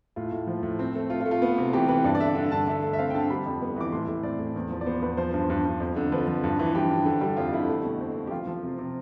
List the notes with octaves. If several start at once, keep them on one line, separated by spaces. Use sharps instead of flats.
A2 F4
A2
F3
A2
C4
A3
A3 F4
F4
A3
F4
B3
C3
E3 G4
E3 B4
G2 D5
D5
D3 E5
D3
G2 A5
D3 E5
A3
E5
C4 F5
G5
D3 A5
G3 B5
F2
B3
E3 D6
A2 C6
A2
C4 D5
A2
E2
F3
D5
B3 C5
E2 B4
F3 C5
G2
G2
G2
F2
D3
F3 B4
F3
G2
E3
G2 G4
G2
D3
G3
F2 F4
D3 E4
A3
B2
C4
B2
G4
F3 F4
F3
C3
C3